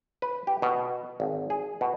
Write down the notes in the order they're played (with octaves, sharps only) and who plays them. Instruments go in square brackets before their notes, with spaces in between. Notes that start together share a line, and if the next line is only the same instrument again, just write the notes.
[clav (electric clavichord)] B4
G4
B2
G#1
G#4
B2